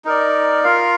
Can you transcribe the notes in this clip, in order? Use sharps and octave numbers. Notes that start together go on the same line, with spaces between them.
D#4 A#4 D5
F4 A#4 F5